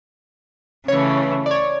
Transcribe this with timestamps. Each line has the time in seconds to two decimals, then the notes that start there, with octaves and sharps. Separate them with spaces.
0.88 C#3 E3 A3 C#5
1.46 D5
1.51 C#5